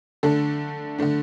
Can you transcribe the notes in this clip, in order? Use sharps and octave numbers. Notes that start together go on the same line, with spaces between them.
D3 A3 D4 A4
D3 A3 D4